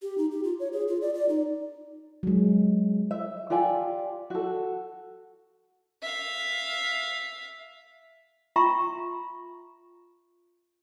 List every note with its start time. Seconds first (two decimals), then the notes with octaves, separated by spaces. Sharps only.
0.02 G4
0.18 D#4
0.31 G4
0.44 F4
0.60 C#5
0.73 G#4
0.88 F4
1.02 D5
1.14 D5
1.29 D#4
2.23 F#3 G#3
3.11 E5
3.50 F4 G4 D5 G#5
4.30 F#4 A4
6.02 E5 F5
8.56 F4 E5 G5 A#5 C6 C#6